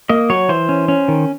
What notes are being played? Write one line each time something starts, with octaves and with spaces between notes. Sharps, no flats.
A#3 D#5
F#3 C#5
E3 C5
C#4
C#4
D#3